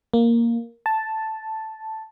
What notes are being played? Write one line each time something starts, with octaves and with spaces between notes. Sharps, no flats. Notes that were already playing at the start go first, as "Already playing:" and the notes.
A#3
A5